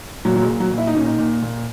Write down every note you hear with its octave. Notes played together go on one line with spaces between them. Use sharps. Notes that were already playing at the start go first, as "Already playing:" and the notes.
A#2 F#3
F#3
G#3
A#2
F#3
A#2
E4
D#4
A#2 C#4
D#4
A#2
A#2